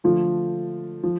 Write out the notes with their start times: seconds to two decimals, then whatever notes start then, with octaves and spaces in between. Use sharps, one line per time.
0.04 D3 F3 A3 F4
1.03 F3